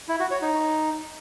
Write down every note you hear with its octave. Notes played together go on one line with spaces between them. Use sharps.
E4
F#4
C#5
D#4